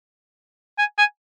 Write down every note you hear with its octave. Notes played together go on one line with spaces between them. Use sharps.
G#5
G#5